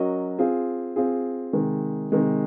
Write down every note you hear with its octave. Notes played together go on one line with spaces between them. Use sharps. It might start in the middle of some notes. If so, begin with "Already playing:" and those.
Already playing: F#3 C#4 F#4 A#4 D#5
C4 F4 G#4
C4 F4 G#4
C3 D#3 G#3
C3 D#3 G#3